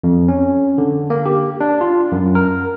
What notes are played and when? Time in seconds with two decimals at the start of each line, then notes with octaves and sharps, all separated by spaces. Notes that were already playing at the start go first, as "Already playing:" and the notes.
0.04 F2
0.28 C#4
0.78 D3
1.10 A#3
1.25 G4
1.61 D4
1.81 F4
2.12 F#2
2.35 A#4